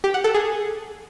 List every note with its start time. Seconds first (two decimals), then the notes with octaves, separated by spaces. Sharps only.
0.04 G4
0.14 F#5
0.24 A4
0.35 G#4